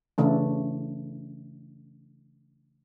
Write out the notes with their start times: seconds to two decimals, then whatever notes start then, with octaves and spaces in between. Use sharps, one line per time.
0.18 C#3 E3 A3 D4